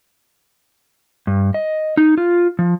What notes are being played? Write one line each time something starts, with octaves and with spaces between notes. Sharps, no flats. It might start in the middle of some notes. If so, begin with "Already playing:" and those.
G2
D#5
D#4
F4
F3